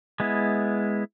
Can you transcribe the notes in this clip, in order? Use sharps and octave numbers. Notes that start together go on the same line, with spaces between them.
G#3 B3 E4